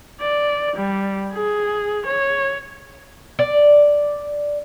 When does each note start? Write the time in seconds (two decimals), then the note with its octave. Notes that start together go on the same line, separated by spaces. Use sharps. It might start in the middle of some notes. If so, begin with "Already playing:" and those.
0.20 D5
0.76 G3
1.33 G#4
2.06 C#5
3.39 D5